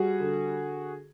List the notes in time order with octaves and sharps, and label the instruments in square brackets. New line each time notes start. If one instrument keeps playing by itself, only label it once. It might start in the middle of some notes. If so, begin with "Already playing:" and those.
Already playing: [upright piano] G3 F#4 G#4
D3